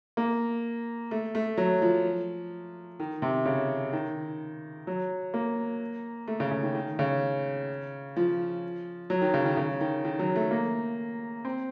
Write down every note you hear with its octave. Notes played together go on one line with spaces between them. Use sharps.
A#3
A3
A3
F#3
F3
D#3
C3
C#3
D#3
F#3
A#3
A3
C#3
C#3
D#3
D#3
C#3
F3
F#3
D#3
C#3
D#3
C#3
D#3
D#3
F#3
A3
A#3
C4